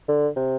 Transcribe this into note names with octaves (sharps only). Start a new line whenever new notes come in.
D3
C3